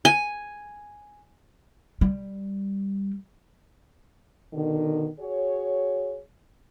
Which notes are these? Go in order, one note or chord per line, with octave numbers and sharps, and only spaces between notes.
G#5
G3
B2 D3 D#3
F#4 G#4 C#5